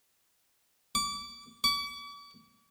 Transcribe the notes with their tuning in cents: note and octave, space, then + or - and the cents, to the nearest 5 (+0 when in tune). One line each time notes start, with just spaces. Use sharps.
D6 -25
D6 -45